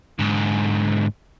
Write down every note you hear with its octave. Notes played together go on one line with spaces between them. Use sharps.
G#2 D3